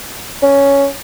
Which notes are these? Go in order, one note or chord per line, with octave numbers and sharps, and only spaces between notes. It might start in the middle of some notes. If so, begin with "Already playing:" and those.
C#4